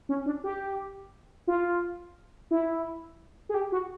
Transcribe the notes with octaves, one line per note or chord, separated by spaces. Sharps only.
C#4
D4
G4
F4
E4
G#4
G4
F#4